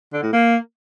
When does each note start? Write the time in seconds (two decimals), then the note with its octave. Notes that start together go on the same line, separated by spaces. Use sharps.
0.13 D3
0.23 A2
0.33 A#3